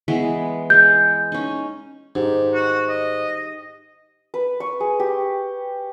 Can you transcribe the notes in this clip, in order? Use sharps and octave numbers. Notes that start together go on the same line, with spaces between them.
E3 G#3 B3
G#3 G6
C#4 D#4
G#2 D#4 G4
F#4
D#5
B4
C#6
G#4
G4